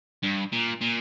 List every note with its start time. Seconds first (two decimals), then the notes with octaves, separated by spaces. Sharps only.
0.23 G2
0.53 A#2
0.81 A#2